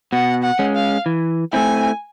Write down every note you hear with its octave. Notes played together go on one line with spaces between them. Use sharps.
B2 F#5
F#5
G#3 C#4
F5
E3
A3 C4 E4 G#5